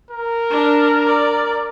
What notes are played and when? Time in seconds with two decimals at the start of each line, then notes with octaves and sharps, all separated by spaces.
0.10 A#4
0.51 D4
1.07 D5